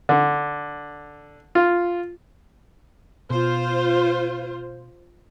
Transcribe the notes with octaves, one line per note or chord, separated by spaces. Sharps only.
D3
F4
B2 F4 C5